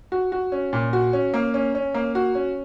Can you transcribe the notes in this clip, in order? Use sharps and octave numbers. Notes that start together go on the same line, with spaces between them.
F#4
F#4
C#4
A#2
F#4
C#4
A#3
C#4
C#4
A#3
F#4
C#4